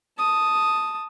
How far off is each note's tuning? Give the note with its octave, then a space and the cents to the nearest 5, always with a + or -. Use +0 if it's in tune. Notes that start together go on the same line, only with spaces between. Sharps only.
A5 +0 D#6 +0